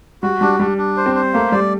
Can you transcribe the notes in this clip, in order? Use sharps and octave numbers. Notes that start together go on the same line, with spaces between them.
G3 F#4
G3 D4
G3 D4
D4
C5
C4
C5
A3 A#3
G3 D5